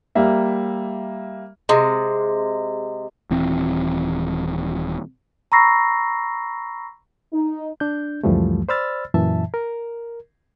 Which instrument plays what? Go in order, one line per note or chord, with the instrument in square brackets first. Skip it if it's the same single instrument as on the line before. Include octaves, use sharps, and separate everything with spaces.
[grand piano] G3 A#3 E5
[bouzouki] C3 G#3
[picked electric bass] D#1 E3 C4
[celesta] A#5 B5 C#6 E6 A#6 C7
[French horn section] D#4
[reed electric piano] D4 G6
C#2 F#2 E3 F3 G3 A3
C5 D5 B5 E6 F6 A6
F#2 A#2 E3 E5 A5
A#4